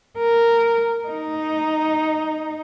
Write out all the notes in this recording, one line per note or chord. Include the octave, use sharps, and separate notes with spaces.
A#4
D#4